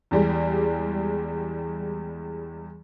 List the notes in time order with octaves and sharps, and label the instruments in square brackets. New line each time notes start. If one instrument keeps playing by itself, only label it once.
[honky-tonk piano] E2 G3 G#3